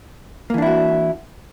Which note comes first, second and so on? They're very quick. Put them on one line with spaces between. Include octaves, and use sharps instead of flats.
A#3 E3 D4 E4 F#4